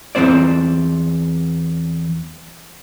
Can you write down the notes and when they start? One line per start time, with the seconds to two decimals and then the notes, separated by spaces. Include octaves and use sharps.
0.15 E2 C3 C4 C5 D5